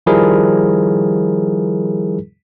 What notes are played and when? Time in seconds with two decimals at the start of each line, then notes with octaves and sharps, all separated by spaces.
0.06 D#3 F3 G3 E4 G#4 A#4